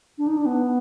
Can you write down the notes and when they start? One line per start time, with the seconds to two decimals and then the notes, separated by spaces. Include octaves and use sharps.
0.18 D4
0.27 D#4
0.37 D4
0.46 B3